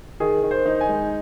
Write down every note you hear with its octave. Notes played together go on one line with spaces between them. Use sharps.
D#3 G#4
D#3
C5
D#4
G#5
G#3